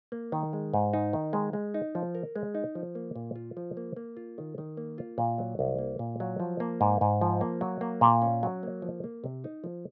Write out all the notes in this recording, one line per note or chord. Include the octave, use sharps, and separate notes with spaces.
A#3
D#3
G#3
G#2
D#4
D#3
G#3
G#3
D#4
F3
A#4
G#3
D#4
F3
A#3
A#2
F4
F3
A#3
A#3
F4
D#3
D#3
A#3
F4
A#2
F#3
C2
A#3
A#2
F#3
F3
A#3
G#2
G#2
F3
A#3
F#3
A#3
A#2
C#4
F#3
A#3
F3
A#3
C3
D#4
F3